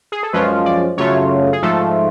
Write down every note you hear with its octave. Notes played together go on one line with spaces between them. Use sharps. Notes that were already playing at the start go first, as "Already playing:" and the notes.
G#4
A4
F#2 F3 G#3 C#4 F4 B4
D5
F#2 C#3 F#3 A3 F4 C#5
G#4
G#2 F3 A3 F4 A4